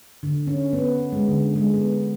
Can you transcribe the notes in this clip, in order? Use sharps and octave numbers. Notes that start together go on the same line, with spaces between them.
D3
C#4
B3
G#3
D3
G#3
B3